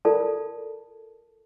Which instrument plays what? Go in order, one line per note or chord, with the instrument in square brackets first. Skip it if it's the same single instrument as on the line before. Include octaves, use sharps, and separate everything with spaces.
[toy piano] F4 A4 A#4 D5 A5